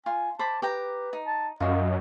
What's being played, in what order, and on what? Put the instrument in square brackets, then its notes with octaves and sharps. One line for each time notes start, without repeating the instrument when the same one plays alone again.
[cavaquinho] F4 [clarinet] G#5
[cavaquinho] C5 B5 D6 [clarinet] A5
[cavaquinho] G4 G5 A#5 [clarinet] B4
[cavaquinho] D#4
[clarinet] A5
[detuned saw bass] F#2 [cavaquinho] F4 F#4 [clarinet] D#5